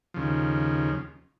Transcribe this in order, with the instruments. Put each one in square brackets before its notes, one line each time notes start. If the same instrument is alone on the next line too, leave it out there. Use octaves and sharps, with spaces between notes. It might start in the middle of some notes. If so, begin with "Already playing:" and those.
[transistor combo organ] D#2 C#3 F3